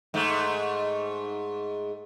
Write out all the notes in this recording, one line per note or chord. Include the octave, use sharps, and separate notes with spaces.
G#2 A3